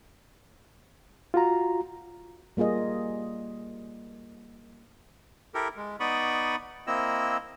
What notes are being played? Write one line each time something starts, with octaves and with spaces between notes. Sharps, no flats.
F4 F#4 A#5
G3 A#3 F4 G#4 D#5
E4 G4 A4 A#4
G#3
B3 D#4 D5 B5 C#6 D#6
A#3 C4 E4 D#5 E6